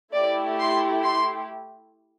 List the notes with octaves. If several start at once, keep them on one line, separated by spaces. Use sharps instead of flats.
A3 E4 G4 D5
C6
C6